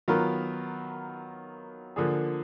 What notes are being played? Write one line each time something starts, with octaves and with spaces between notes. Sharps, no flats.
D#3 F#3 B3 F4 A#4
D3 F3 A#3 D4 G#4